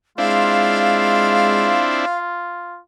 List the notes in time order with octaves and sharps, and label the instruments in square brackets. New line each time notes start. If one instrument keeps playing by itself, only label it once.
[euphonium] G#3 [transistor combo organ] C4 D4 E4 [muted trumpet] F4 [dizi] F5